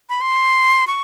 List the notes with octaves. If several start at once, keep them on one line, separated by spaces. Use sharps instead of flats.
B5
C6
C#6